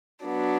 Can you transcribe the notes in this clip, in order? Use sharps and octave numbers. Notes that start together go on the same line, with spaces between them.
F#3 B3 D4